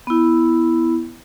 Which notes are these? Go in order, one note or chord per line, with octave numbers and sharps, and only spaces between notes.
B3 E4